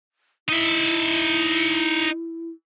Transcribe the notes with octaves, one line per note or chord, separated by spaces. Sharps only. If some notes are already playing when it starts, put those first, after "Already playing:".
D#4 E4 E5